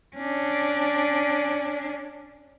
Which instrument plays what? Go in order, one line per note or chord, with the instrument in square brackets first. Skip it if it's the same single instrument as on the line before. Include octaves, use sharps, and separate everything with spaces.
[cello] C#4 D4